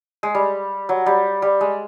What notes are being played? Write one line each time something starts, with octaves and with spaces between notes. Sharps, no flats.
G#3
G3
F#3
G3
G3
G#3